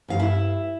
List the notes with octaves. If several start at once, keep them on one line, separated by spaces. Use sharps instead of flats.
G2 F5
E4 E5